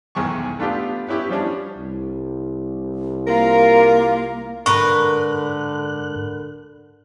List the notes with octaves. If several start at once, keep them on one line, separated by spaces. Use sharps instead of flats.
B1 E2 G#2 D#3 G#5 C#6
A3 B3 D4 F4 G4
B3 C#4 E4 G4
F3 G3 C#4 D4
C2
A#3 F4 A#4 A#5
G#2 D3 A#4 B4 C#6 F#6